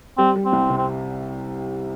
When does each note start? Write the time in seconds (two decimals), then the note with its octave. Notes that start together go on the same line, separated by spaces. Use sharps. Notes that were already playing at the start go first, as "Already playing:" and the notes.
0.18 G3 C4
0.36 G3
0.45 C4
0.53 C2
0.70 C3
0.78 C4